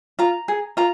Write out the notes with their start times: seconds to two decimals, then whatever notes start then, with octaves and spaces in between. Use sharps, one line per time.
0.19 F4 A#5
0.48 G#4
0.77 F4 A#5